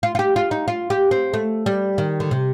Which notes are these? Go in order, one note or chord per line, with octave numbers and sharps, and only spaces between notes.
F4
F4
G4
F4
D#4
F4
G4
C4
A3
G3
D#3
D3
C3